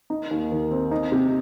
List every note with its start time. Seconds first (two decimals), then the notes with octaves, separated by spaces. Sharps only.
0.10 D#4
0.31 D#2
0.52 D#3
0.71 C4
0.91 D#4
1.12 C3